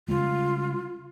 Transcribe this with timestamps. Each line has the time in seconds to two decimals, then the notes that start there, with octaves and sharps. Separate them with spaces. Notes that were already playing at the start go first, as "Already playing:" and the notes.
0.09 C#3 G3 G#3 F4